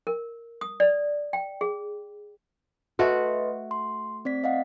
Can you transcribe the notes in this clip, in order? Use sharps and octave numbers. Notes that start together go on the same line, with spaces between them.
A#4
D#6
D5
G5
G#4
A3 F#4 B4 D#5 C6
C6
C4 D5 B6
D#5 F5 F#5